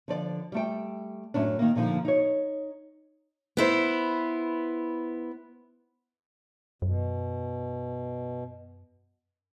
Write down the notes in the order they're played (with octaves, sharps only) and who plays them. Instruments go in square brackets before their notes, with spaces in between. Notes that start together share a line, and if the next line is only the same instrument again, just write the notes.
[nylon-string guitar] D3 F3 D5
G3 A3 G5
F#2 A2 C#4 D4
D#3 A#3
A#2 D3 F3 D#4
D#4 C#5
[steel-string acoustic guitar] B3 E4 C5
[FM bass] F#2 [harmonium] B2